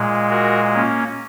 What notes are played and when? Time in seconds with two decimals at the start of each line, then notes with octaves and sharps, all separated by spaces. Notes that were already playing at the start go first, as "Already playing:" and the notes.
Already playing: A#2 G#3
0.30 F#4 A#4
0.74 A#3 C#4